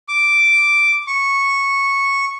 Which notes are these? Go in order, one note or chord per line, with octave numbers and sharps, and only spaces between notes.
D6
C#6